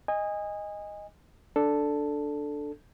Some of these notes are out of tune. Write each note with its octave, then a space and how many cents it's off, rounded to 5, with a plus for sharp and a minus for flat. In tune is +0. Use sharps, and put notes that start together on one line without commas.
D#5 +0 G#5 -25
D4 +0 A4 +0